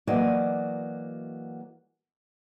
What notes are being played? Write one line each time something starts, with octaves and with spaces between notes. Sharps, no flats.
E3 F#3 A#3 F#4 D5 D#5